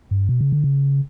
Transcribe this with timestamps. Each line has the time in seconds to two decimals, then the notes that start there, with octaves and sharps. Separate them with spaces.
0.11 G2
0.29 B2
0.41 C#3
0.52 D3
0.64 C#3